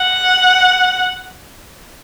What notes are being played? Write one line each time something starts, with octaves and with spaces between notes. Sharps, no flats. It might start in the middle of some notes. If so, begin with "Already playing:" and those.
Already playing: F#5